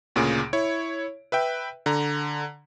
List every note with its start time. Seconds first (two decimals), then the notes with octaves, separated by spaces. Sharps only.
0.16 D2 A#2 C#3 G#4 D7
0.53 E4 C#5
1.32 B4 E5 G5
1.86 D3 A#5